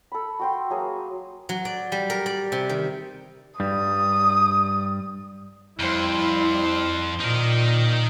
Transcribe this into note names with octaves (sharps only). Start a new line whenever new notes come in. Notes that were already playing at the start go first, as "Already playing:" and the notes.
A4 B5
F#4 G5 C6
F#3 A#3 G#4
F#3
D5
G3
A#4
D5
C3
D#3
G2 G3 D#6
F2 G3 E4 C5
A#2 D#4 A#4